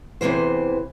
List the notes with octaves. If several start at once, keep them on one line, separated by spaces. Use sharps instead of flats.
E2 G#2 C3 E3 C5